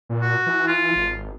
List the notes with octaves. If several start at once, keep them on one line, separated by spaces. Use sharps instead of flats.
A#2
F#4
E3
F4
G#1